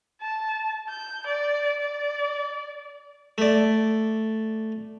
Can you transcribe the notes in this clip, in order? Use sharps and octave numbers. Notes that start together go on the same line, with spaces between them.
A5
G6
D5
D5
A3 D5